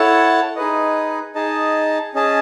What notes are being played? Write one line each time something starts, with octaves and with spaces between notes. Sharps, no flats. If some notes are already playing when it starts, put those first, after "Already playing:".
Already playing: E4 A4 C#5 F#5 A5
D#4 G#4 B4 D#5
D#4 G#4 D#5 A5
C#4 G#4 D#5 A5